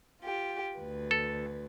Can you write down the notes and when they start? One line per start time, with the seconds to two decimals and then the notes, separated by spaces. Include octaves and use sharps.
0.21 F4 G4
0.77 D2 B4
1.11 A4